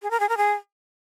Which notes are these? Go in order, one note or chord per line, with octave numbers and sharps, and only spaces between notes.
G#4
A#4
G#4
A#4
G#4